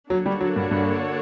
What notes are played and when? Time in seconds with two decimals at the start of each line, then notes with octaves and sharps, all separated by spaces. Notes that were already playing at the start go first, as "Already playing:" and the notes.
0.10 D3 F#3 A#3 D4 F#4 C#5
0.26 G3
0.41 F#3
0.56 G2
0.71 G2